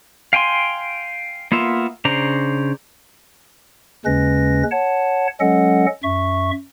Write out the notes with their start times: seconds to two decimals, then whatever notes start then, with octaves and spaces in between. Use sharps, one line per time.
0.33 F5 G5 G#5 C6
1.52 A#3 B3 F4 E5
2.05 C#3 D4 C5 A#5
4.06 D#2 C#3 G#3 C#4 B4 A#6
4.71 C#5 F#5 A5
5.40 F#3 G#3 C#4 A4 D#5 F#5
6.03 F#2 E5 C#6